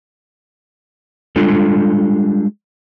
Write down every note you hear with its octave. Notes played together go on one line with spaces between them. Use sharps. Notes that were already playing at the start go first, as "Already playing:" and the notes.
G3 G#3 D4 F4 A4